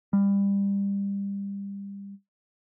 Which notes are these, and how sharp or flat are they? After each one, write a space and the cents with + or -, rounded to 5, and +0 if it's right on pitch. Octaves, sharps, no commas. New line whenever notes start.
G3 +25